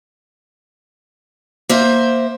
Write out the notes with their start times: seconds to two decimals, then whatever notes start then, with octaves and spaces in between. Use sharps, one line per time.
1.69 A#3 C5 E5